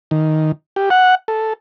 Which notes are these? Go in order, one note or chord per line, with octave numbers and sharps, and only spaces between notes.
D#3
G4
F#5
A4